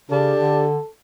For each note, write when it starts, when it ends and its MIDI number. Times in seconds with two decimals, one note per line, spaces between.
0.10 0.34 49
0.10 0.69 62
0.10 0.66 67
0.10 0.88 69
0.40 0.78 50